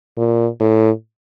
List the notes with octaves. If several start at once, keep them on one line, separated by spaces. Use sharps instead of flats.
A#2
A2